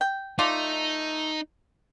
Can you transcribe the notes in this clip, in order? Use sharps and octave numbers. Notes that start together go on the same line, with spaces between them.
G5
A3 D#4 F4 D5